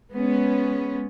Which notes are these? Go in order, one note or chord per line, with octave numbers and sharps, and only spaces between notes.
G#3 B3 C#4